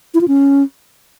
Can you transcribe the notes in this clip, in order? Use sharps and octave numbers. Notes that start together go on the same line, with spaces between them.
E4
F4
C#4